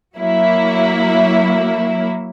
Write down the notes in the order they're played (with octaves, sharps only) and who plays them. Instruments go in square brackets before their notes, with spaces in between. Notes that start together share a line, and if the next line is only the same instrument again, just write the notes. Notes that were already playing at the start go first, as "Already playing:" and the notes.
[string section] F#3 A#3 E4